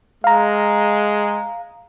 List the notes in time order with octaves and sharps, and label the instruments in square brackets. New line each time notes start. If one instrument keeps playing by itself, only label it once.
[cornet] G#3 [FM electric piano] F5 A#5